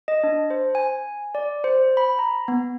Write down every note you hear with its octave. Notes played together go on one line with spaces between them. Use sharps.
D#5
D4
C5
G#5
D5
C5
B5
A#5
B3